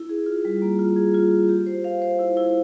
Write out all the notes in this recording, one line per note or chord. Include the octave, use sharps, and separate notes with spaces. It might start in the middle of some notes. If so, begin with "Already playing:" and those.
Already playing: E4
G#4
F4
G3
A#3
F4
G#4
F4
F4
G4
C5
F5
C5
E4
E4